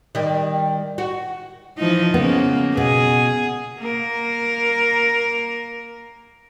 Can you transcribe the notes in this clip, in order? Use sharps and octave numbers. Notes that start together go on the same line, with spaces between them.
D#3 G3
F#4
E3 F3 D#4
C#3 A#3 B3
B2 G#4
A#3 A#4